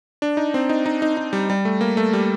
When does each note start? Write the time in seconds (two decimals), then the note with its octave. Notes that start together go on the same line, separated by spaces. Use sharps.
0.22 D4
0.37 D#4
0.54 C4
0.69 D#4
0.86 D#4
1.02 D#4
1.17 D#4
1.33 G3
1.50 G3
1.65 A3
1.81 A#3
1.97 A3
2.13 G3